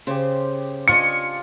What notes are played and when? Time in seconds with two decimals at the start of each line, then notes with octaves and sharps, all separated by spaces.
0.07 C#3 G4 C5
0.88 D4 F4 D#5 G#5 C#6 C#7